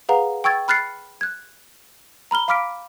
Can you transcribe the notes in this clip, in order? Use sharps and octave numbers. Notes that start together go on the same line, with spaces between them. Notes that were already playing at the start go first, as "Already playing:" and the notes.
G#4 B4 F5 F#5 A#5
G5 C#6 E6 G#6 A6
B5 F6 F#6 A6 C7 C#7
F#6 G#6
A#5 B5 F6 G7
F5 B5 D6 F6 B6 D7